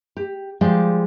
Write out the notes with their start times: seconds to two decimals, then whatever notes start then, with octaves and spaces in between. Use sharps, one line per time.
0.17 G4
0.61 F3 G3 G#3 G4 D5 F5